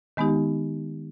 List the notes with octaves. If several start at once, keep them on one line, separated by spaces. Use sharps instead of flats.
D#3 G#3 B3 D#4 G4